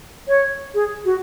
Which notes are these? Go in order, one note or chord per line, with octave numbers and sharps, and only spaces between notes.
C#5
G#4
F#4